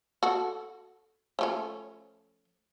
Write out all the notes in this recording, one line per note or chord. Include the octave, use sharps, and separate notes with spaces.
F#4 A4
F3 A3 C#4